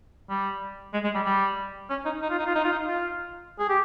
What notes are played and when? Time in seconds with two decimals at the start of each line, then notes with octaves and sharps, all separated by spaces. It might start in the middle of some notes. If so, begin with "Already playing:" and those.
0.30 G3
0.93 G#3
1.04 G#3
1.15 G3
1.25 G3
1.90 C#4
2.05 D#4
2.21 D#4
2.30 F4
2.39 D#4
2.46 F4
2.55 D#4
2.64 F4
2.72 D#4
2.86 F4
3.59 G#4
3.69 G4